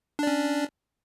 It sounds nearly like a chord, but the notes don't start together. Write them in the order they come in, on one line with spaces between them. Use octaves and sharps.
D4 D5 C#4